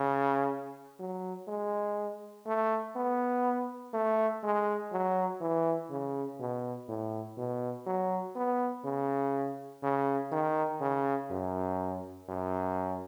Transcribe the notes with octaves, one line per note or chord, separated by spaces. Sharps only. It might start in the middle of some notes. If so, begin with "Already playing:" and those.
Already playing: C#3
F#3
G#3
A3
B3
A3
G#3
F#3
E3
C#3
B2
A2
B2
F#3
B3
C#3
C#3
D#3
C#3
F#2
F#2